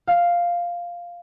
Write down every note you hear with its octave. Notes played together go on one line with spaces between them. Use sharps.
F5